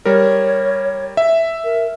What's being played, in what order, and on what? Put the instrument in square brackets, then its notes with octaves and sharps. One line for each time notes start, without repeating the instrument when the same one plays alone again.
[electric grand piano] G3 A#4 [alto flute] C#5
[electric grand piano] E5
[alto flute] A#4